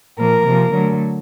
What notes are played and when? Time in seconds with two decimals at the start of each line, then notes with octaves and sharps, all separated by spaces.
0.18 A#2 F3 A#3 A#4
0.45 C3 F3 A#3
0.74 D3 F#3 A3